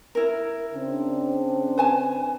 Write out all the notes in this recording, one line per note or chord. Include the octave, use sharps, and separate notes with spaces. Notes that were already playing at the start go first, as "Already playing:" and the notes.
E4 A#4
C#3 C4 D4
B4 G#5 A5